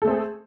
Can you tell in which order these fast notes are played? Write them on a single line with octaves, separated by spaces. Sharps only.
A4 A3 C4 G#4